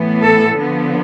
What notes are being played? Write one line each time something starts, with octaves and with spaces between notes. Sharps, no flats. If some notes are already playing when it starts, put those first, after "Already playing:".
Already playing: A2 E3 B3
A4
D3 F3 B3